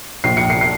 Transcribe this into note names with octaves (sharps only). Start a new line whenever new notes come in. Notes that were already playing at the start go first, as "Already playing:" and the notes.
A#1 C7
C#7
C7
C7